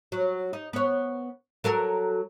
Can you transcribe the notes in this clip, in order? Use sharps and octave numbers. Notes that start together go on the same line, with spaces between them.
F#3
D#4
B3 C#5
F#3 A4 A#4